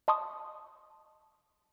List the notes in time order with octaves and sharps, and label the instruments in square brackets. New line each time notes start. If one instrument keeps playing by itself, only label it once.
[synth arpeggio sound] D#5 A5 C6 C#6 D#6